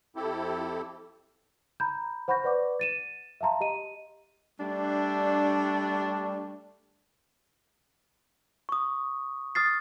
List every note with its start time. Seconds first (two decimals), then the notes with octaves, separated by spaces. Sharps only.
0.16 F2 C4 E4 G4 A4
1.80 A#5 B5 G6
2.28 C5 F#5 B5 C#6 G6 A#6
2.44 B4 D5 F#5 C#6 D6
2.80 A6 D#7 E7
3.41 E5 F5 A5 A#5 C6
3.61 G4 D#5 D#7
4.60 G3 A3 D4
8.69 C#6 D#6
9.55 D#6 F6 A6 C7